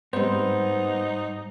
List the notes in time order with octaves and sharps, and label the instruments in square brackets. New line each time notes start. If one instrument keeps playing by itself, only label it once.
[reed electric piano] G#2 G3 [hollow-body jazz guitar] B3 C4 [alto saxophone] D#4 [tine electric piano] C5